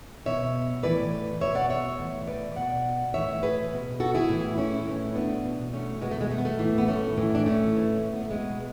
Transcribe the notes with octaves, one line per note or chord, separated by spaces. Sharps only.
B2 C#5 E5
A2 E3 B4 D5
B2 C#5 E5
D5 F#5
C#5 E5
A2 E3
B4 D5
B2 D5 F#5
A2 E3 C#5 E5
G#4 B4
B2
F#4 A4
E4 G#4
A2 E3
C#4 E4
A2 E3
B3 D4
B2
A3 C#4
B2 G#3 B3
A3
G#3
A3
B3
A3
A2 E3
B3
A3 C#4
A2 E3
D4
A3 C#4
A2 E3
C#4
B3
A3
B2 G#3 B3